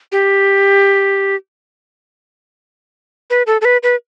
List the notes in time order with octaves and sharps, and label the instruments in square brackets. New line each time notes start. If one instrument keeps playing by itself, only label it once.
[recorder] G4
B4
A4
A4
B4
B4